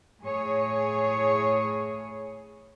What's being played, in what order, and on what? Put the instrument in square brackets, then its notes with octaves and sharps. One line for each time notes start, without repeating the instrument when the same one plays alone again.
[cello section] A2 G#4 C#5